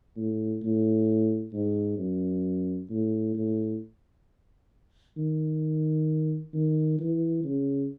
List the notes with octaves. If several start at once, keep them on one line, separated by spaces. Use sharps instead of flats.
A2
A2
G#2
F#2
A2
A2
D#3
D#3
E3
C#3